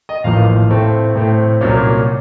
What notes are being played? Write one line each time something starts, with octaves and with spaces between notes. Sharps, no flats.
D#5
A1 A2 F3 A#3 F5
A2 A3 C4
A2 A3 C4
C2 A#2 F#3 A#3 C#4